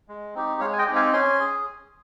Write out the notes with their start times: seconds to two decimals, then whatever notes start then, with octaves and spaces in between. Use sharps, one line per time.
0.08 G#3
0.35 C4 D#4 G4
0.61 G#3 C#5 F5
0.73 G#5
0.79 D#5 G5
0.87 C4 D#4 G4
0.96 F5 G#5
1.13 C#4 G#5 C6
1.39 G#4